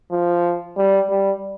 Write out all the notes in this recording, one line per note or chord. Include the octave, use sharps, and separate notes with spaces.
F3
G3
G3